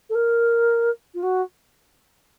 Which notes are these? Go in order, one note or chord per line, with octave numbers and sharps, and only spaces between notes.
A4
A#4
F4
F#4